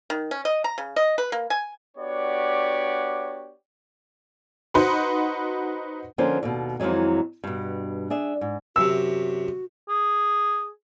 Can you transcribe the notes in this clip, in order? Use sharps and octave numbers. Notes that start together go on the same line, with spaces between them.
D#3
C#4
D#5
A#5
C#3
D#5
B4
A#3
G#5
B3 D4 F#4 G4 C#5 D5
D#4 F#4 B4 C5 F#5 C6
D3 F3 A#3 C#4 C5
D#2 B2
F2 D#3 E3 F#3 G#3
G2 B2
D4 G#4 E5
G#2
F#2 C3 F#4 E6
G#4